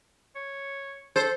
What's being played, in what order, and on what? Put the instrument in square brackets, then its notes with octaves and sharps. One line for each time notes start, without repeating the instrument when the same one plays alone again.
[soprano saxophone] C#5
[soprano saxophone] A4 [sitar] C5